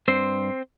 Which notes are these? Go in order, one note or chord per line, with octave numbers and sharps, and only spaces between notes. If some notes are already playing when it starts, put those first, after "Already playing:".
G2 C4 C5